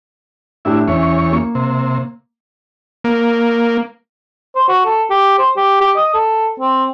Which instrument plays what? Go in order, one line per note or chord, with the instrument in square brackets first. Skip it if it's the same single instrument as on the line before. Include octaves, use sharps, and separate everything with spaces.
[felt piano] A2 D4 G4 [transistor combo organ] E4
[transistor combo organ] E2 C#5 [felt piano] C#4 E5
[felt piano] A#3
[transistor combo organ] C3
A#3
[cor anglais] C5
F#4
A4
G4
C5
G4
G4
D#5
A4
C4